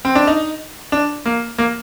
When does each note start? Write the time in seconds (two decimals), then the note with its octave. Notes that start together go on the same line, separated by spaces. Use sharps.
0.05 C4
0.15 D4
0.27 D#4
0.92 D4
1.26 A#3
1.58 A#3